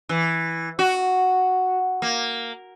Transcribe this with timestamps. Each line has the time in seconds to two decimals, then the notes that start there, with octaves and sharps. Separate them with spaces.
0.09 E3
0.79 F#4
2.02 A#3